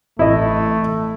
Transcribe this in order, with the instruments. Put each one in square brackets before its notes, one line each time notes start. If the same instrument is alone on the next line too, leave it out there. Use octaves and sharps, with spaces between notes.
[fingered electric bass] A1 C4 [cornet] A3 [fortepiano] E4 D#5